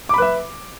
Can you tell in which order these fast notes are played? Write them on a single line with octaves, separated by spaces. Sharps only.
D6 B5 B4 E5